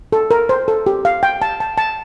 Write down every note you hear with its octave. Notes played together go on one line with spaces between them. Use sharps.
A4
A#4
C5
A4
G4
F5
G5
A5
A5
A5